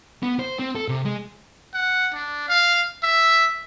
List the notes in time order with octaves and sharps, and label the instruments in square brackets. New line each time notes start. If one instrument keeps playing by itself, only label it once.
[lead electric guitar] B3
C5
C4
A4
C3
G#3
[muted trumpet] F#5
D4
F5
E5